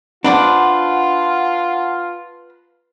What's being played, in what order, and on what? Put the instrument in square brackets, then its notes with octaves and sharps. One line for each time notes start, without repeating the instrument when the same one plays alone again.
[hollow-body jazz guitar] D4 [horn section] F4 [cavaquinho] B4 C5 D6 [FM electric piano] F#5 A5